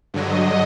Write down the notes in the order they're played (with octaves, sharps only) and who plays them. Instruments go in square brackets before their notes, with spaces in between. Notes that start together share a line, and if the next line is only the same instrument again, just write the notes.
[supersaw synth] G2 D3 F#3 [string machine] D#5